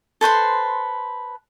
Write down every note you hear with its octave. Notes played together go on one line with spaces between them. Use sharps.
A4 B4 C5 C6